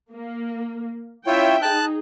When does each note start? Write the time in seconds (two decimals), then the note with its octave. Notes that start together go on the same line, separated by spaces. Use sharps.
0.12 A#3
1.27 C#4 E4 F4 C#5 E5 G5
1.62 D#4 G#4 A5 F#6